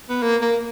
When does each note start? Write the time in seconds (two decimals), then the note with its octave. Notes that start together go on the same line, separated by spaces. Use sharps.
0.09 B3
0.22 A#3
0.42 A#3